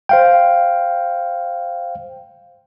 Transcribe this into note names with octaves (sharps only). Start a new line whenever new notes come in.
C5 F5 G5